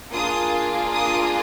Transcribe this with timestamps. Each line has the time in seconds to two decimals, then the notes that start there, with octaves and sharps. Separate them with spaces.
0.11 A#3 D4 F4 G#4 D#6
0.92 D#6